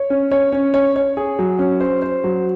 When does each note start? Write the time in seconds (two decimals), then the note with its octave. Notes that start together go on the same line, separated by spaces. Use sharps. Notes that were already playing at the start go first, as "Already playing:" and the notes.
Already playing: C#5
0.10 C#4
0.32 C#5
0.52 C#4
0.74 C#5
0.96 C#5
1.17 G#4
1.39 F#3
1.59 C#4
1.80 C5
2.02 C5
2.24 F#3